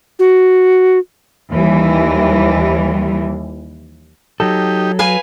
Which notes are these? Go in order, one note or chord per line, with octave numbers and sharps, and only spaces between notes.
F#4
D#2 E3 G3
F#3 D#4 G4 A4
B4 F5 G#5